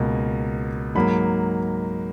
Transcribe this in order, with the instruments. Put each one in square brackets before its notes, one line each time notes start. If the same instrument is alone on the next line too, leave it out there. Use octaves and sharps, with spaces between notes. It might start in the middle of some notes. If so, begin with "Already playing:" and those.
Already playing: [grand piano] C#2 B2 A#3
G#2 F#3 A#3 B5